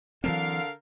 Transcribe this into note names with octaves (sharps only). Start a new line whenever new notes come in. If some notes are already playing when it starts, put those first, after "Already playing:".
D3 E3 F#3 C4 A#4 F5